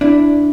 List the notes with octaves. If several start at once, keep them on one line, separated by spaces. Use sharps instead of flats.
D4 E4